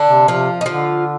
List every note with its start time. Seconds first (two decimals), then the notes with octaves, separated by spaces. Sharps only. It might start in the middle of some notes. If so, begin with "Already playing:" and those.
Already playing: D3 D4
0.09 C3
0.28 C3 F3 F4
0.61 D#4
0.66 D3 F3 F4